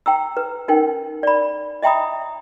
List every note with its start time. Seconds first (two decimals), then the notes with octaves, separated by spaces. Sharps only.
0.06 G5 A#5 E6
0.37 B4
0.68 C#4 D#4 A#4 G5
1.23 D5 B5
1.82 D#5 E5 G5 A#5 B5 D#6